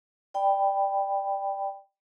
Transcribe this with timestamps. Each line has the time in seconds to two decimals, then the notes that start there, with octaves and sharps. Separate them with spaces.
0.34 D5 G5 B5